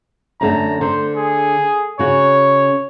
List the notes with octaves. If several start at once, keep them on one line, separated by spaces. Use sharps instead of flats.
F#2 D3 A3 A#5
D3 C5
G#4
C#3 F#4 C#5